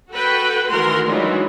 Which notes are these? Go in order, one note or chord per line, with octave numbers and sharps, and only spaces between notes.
F#4 A4 B4 G5
D#3 E3 A3 F#4 A#4 C6
E3 F#3 G#3 D4 D#4 F4